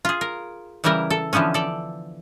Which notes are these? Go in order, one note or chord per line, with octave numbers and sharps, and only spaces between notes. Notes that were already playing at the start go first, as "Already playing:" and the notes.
F4 G#4
A#4
C#3 E3 G3 E4 A#4
A4
D3 E3 F3 B3 C#4
A4 D5